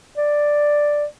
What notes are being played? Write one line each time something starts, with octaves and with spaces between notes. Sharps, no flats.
D5